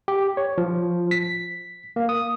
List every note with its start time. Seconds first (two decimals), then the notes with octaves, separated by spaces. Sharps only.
0.08 G4
0.37 C#5
0.58 F3
1.11 B6
1.96 A#3
2.09 D#6